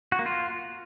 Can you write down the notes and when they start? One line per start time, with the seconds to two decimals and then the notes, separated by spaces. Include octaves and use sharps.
0.12 F#4
0.19 A#3
0.26 F4